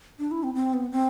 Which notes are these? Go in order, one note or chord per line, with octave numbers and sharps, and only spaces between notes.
D4
E4
C4
C4
B3
C4